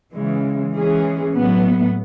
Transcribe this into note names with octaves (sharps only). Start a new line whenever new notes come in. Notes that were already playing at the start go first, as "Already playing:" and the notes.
C#3 E3 G#3
E3 G#3 C#4 G#4
A2 F#3 B3